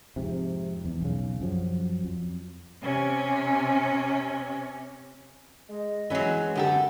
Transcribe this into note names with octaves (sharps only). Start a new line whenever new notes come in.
F2 G#2 C3
E2
B1 C#3
F#2 F3 F#3
F2
C3 C#4
G#3 D#5
E3 F#3 G#3 B3 C#4
F#2 D3 G4 A4 F#5